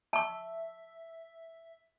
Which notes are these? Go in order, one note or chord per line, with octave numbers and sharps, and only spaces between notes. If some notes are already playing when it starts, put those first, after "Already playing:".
E5 A5 C#6